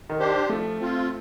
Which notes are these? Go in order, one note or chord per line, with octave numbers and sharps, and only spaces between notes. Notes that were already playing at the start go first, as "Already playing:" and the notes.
D#3
D4 G4 C5
F3 A3
C4 F4